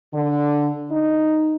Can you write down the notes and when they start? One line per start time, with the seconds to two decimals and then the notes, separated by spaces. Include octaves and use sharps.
0.13 D3
0.91 D#4